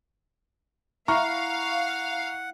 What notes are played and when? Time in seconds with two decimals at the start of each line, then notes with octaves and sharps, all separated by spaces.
1.08 E4 F5 F#5 A#5 C#6 F6